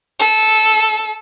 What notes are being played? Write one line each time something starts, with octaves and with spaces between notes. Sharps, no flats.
A4